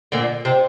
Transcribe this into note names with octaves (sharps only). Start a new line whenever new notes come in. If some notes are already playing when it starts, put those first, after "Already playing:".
A#2 D3
C3